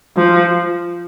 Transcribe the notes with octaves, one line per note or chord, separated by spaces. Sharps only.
F3